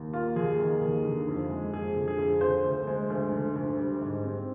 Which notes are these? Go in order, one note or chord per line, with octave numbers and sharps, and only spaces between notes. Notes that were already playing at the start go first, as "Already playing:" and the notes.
Already playing: D#2
A#3 F4
D#2 G#4
D#3
D#2
D3
F2
G#3
F2 G#4
D3
G#4
F2
D3 C5
D2
G#3
D2
D3
D2
G3
G#2
C4